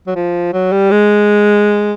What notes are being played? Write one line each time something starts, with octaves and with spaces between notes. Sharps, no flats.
F#3
F3
F#3
G3
G#3